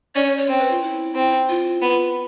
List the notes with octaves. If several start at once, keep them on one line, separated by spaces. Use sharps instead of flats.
C#4 D5
C#5
C#5
C4
B4
F4
E4
C4
F4
B3